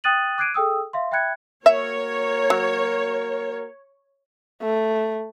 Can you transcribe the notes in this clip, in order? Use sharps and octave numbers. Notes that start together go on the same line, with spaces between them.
G5 D#6 F#6 A6 D#7 F#7
D6 F#6 G#6 C7 D7 D#7
G#4 A4 G5 D#6 E6
E5 F5 C6
E5 G5 B5 F#6 G#6 C#7
A#3 F#4 A#4 C#5 E5
F#3
A3